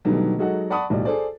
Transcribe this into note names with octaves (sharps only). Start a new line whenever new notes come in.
B2 D3 D#3 F#3 G3 A3
F#3 G#3 D#4 F#4 A4 F#5
D5 F#5 A5 B5 C#6 D#6
B1 A2 G3 D5
G#4 A4 C5 D5